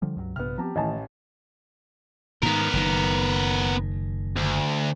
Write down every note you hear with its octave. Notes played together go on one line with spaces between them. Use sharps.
D3 F3 G3
C#2 G2 F#3
A#1 G2 C3 B3 F6
F3 B3 C4 G4 A5 A#5
A1 D#3 E3 A3 D#5 G#5 A5
G#2 D#3 B3 A#4
F#1 D#3
D2